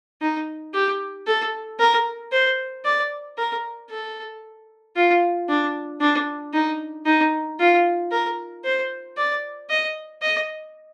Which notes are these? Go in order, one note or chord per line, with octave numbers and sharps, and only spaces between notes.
D#4
G4
A4
A#4
C5
D5
A#4
A4
F4
D4
D4
D#4
D#4
F4
A#4
C5
D5
D#5
D#5